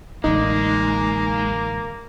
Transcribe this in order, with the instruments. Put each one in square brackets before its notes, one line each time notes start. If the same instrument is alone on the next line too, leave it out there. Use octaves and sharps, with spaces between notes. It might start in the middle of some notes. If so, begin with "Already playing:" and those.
[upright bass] A1 D3 [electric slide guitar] G#3 [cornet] A#3 [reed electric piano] D#4